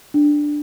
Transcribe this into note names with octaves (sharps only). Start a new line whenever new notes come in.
D4